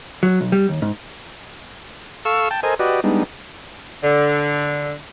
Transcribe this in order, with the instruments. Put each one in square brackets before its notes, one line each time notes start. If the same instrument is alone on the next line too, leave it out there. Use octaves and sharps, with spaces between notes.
[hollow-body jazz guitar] F#3
B1
G3
D#2
G#2
[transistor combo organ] A4 F5 C#6 E6
G5 A5
A4 A#4 C5 D#5 G#5
F#4 G4 B4 D5 D#5
G3 G#3 B3 D4 D#4
[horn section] D3